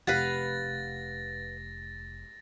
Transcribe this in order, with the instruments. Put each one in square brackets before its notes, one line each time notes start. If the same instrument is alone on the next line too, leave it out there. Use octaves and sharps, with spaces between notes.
[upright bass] F1 [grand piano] G4 [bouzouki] B4 F5 F#5 [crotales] A6 A#6